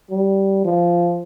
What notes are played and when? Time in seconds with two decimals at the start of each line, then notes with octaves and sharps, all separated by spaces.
0.11 G3
0.65 F3